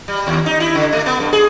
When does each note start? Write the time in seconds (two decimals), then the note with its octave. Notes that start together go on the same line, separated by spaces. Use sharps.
0.08 G3
0.27 D#2
0.46 D#4
0.60 E4
0.75 D3
0.93 A3
1.06 B3
1.20 G2
1.33 G#4